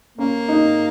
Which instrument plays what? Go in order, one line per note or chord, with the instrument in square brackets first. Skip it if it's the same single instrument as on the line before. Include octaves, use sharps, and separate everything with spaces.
[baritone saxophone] A#3 [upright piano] C#4
[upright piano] D#4